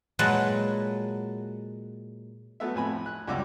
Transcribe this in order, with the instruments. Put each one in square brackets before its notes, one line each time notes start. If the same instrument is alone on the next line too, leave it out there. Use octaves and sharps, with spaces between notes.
[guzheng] A#2 F#3 G#3 B4 F#5 A5
[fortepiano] F#3 A3 B3 E5
F2 A2 G#5 B5
F#6
C#2 F#2 G3 F#5 D6 E6